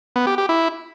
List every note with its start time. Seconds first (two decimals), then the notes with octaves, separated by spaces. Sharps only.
0.16 B3
0.27 G4
0.38 G4
0.49 E4